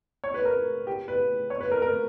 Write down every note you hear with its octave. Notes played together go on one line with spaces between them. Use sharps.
C#5
B4
A#4
G4
B4
C#5
B4
A#4
A#4